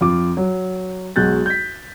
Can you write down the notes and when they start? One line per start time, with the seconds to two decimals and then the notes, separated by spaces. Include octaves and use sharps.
0.01 F2 F4 D6
0.37 F#3
1.16 B1 G#3 F#4 F#6 G6 A6
1.46 G6 B6